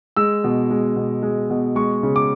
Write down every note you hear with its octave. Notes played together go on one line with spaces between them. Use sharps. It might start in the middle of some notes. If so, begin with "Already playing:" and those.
G#3 E6
B2
G#3
B2
G#3
B2
G#3 C#6
C#3
D6